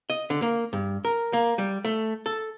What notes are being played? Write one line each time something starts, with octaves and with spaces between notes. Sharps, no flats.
D#5
D3
A#3
G2
A#4
A#3
G3
A3
A4